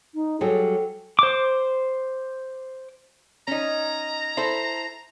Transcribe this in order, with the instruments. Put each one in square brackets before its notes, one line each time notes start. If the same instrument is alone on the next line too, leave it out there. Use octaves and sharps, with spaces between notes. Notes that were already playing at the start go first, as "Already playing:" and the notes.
[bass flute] D#4
[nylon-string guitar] F#3 G3 G#4 [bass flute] A4
[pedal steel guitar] C5 D6
[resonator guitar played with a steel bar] C#4 D#4 [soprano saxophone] A#5
[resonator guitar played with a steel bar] E4 A4 C5